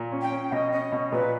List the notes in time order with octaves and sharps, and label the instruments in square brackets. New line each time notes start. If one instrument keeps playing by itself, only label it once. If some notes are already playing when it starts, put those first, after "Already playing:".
Already playing: [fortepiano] A#2
C#4
[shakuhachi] G5
[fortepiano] C#4
[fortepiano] B2 [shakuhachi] D#5
[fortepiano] C#4 [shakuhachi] D#5
[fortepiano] B2
[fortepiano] A#2 [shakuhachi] B4